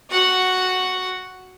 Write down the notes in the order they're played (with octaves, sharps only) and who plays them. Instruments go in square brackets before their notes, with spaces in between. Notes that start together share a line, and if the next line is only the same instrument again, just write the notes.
[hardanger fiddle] F#4 F#5